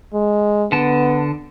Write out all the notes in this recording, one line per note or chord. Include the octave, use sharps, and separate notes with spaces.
G#3
D3 B3 A5